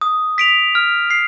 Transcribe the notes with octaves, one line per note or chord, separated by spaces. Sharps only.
D#6
B6 D7 F7
F6
C7